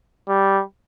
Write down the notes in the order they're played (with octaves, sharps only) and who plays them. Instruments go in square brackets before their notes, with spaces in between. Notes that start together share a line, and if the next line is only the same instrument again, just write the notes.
[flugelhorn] G3